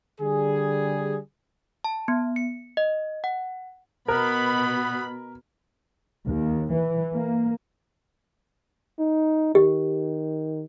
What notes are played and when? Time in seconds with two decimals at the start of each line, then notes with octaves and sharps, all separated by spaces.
0.21 D3 G3 G#4
1.84 A5
2.08 B3
2.36 C#7
2.77 D#5
3.24 F#5
4.08 B2 B3 A#4 B5
6.27 D#2
6.72 E3
7.13 A#3
8.99 D#4
9.55 D#3 G4